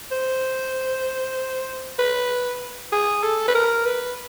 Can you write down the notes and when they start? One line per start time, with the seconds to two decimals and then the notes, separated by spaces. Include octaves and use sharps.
0.11 C5
1.99 B4
2.92 G#4
3.23 A4
3.48 B4
3.55 A#4
3.86 B4